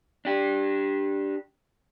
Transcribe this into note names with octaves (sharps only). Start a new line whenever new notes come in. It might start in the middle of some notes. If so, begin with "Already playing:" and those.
D4 G4